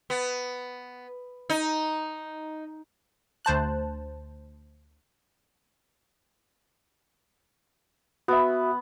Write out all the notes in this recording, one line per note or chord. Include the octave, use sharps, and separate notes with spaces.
B3
D#4
D2 C5 A5 F#6
B3 F#4 E5